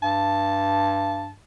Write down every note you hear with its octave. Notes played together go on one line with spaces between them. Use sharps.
G2 A5